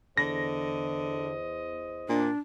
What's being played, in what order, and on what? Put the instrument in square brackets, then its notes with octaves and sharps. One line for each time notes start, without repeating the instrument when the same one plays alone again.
[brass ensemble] E2 C5 D#5 [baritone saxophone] D3 [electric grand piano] A#6
[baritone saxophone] A#2 [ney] D4